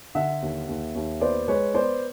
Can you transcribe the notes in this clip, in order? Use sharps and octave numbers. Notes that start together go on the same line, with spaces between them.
D3 E5 F#5
D#2
D#2
D#2
B3 C5 D5
G#3 B4 C#5
B3 C5 D5